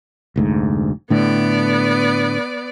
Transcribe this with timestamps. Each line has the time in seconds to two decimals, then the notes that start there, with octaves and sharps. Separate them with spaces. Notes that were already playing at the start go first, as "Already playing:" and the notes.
0.36 F1 D2 G#2
1.10 A2 D3 B3 D5